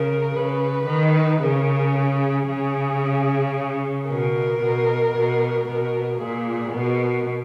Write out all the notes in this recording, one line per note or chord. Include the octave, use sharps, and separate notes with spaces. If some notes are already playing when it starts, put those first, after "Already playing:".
Already playing: C#3 A#4
C#3 B4
D#3
C#3 A#4
G#4
C#3
B2 A#4
B2
B2
B2 A#4
A#2 G#4
B2 A#4